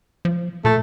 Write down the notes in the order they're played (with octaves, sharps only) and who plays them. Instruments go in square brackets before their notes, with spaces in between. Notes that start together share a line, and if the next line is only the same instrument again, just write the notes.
[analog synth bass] F3
[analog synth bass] A#2 [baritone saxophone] A3